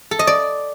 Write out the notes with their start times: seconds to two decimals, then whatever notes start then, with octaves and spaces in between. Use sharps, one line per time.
0.11 A4
0.19 D#5
0.27 D5